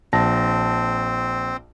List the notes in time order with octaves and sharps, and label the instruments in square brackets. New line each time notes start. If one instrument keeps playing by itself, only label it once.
[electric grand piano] A#1 A5 A#6 [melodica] C4